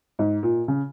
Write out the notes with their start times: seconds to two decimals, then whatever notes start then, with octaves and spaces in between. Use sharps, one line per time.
0.19 G#2
0.43 A#2
0.68 C#3